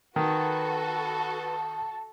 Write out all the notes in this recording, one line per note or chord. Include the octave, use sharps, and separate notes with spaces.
D#3 F#4 A4 B4 A5